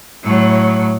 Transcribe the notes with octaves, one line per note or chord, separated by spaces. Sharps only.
A2 F#3